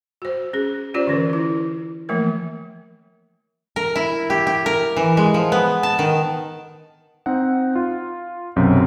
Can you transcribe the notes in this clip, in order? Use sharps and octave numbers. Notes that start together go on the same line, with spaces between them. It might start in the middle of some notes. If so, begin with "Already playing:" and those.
F#4 C5
C#4 G#4
C#4 F4 G4 C5 D5
D3 E3 C#4 A#4
C#4 E4
E3 F3 A3 A#3 A#4
A#4
E4
G4
G4
A#4
E3
G#3
F3
B3
A5
D#3
C4 D#4 F#5
F4
B1 F#2 C3